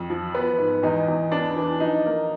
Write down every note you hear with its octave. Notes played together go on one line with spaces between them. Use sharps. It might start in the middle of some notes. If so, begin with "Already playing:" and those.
Already playing: F2
F3
B3
G#2
E2 D#4
E2
B3 D4
E3
F3 D#4
A#3